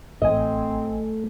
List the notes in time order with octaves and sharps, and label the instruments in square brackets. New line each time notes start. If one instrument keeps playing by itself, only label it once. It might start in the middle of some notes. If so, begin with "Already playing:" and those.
[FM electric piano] A1 G#5 [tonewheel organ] A3 [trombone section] C4 [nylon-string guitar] D#5